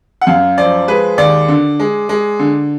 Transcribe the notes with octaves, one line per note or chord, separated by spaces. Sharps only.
F#5
F#2 F5
F3 D5
G#3 B4
D#2 D5
D3
G#3
G#3
D3